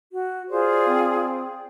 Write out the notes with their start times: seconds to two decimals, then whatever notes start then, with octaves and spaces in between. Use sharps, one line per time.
0.11 F#4
0.50 F4 G#4 C5 D5
0.88 C4